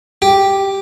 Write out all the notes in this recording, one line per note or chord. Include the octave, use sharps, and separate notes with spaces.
G4